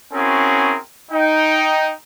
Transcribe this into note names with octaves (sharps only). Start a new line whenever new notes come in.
C4 C#4 E4 F#4 G#4 A#4
D#4 G5